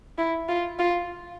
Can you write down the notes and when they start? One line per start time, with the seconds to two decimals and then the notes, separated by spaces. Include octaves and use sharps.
0.18 E4
0.49 F4
0.79 F4